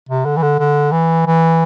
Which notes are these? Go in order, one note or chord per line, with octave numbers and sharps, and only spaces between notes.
C3
D3
E3
D3
D3
E3
E3